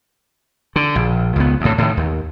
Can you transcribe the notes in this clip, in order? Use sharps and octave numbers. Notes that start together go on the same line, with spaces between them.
D3
A#1
C#2 B3
D2 A2
A2 D#3
D#2